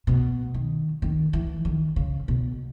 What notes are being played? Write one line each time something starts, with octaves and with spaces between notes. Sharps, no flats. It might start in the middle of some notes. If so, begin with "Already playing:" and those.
B2
D#3
D#3
E3
D#3
C#3
B2